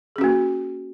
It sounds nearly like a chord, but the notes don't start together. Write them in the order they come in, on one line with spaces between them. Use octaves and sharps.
G#4 C#4 F#4 A#3